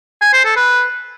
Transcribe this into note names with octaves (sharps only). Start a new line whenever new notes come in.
G#5
C5
A4
B4